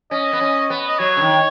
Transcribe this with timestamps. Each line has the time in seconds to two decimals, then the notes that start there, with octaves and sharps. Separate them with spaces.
0.11 C#4 D#5
0.33 B3
0.41 C#4
0.70 B3
0.88 D#5
0.99 F#3 C#5
1.17 C#3
1.21 D#3